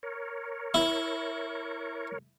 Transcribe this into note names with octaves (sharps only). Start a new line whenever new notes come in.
A#4 C#5
E4